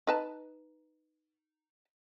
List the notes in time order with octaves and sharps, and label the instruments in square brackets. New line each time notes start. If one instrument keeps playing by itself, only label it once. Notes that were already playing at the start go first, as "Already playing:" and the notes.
[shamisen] D#4 B4 A5